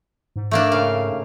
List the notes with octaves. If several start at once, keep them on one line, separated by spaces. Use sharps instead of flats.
G#2
A3 A#3 D4
C#3 F5